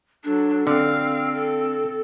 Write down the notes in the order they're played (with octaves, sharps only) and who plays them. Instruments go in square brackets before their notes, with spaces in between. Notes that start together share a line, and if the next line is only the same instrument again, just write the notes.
[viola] F#3 A4 [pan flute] D4
[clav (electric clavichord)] D3 [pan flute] C4 [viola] F5
[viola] A4